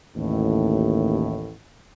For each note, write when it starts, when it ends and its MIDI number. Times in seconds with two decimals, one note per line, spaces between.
0.16 1.51 33
0.16 1.51 39
0.16 1.51 45